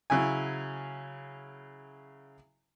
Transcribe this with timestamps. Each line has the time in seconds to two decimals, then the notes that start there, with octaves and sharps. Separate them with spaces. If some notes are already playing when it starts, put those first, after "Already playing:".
0.10 C#3 F#3 E4 G#5